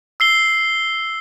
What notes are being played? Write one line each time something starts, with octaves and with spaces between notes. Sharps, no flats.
E6 C7 G7